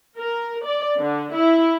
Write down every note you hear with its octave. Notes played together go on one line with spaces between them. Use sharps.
A#4
D5
D3
E4